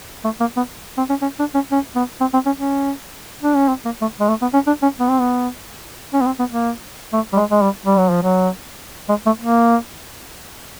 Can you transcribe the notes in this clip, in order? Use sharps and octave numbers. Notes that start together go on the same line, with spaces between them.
A3
A#3
B3
C4
C#4
C#4
D4
C#4
C#4
B3
C4
C4
C#4
C#4
D4
C#4
C4
A#3
A3
G#3
A3
B3
C#4
D4
C#4
B3
C4
B3
C#4
B3
C4
B3
A#3
A3
G3
G#3
G#3
G3
G3
F#3
F3
F#3
G#3
A3
A#3